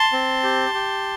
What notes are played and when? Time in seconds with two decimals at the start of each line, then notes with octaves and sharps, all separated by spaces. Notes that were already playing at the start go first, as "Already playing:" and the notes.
Already playing: A5 C6
0.13 C4
0.43 G4
0.74 G4